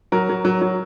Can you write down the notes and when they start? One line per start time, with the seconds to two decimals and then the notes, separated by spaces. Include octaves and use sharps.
0.12 F#3 A#4
0.29 F#3
0.45 F#3
0.62 F#3